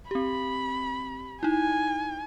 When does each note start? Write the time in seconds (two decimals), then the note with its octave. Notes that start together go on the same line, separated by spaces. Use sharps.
0.11 C4 G4 B5
1.43 D#4 E4 G#5